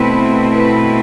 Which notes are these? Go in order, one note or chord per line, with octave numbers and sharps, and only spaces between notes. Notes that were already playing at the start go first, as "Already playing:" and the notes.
Already playing: B2 A3 C4 E4 B4
B4